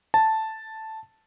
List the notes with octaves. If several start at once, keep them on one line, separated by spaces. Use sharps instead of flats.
A5